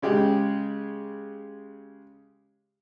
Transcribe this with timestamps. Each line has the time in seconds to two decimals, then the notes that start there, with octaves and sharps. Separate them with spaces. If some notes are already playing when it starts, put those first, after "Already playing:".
0.02 C#3 G#3 G4